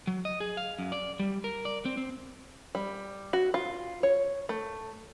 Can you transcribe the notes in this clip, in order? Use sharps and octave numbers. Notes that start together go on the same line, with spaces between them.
F#3
D#5
G#4
F5
F#2
D5
G3
A#4
D5
C4
C4
G3
F#4
F4
C#5
A3